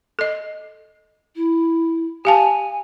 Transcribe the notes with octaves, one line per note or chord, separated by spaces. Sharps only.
A4 D#5
E4
G4 F5 G#5 A5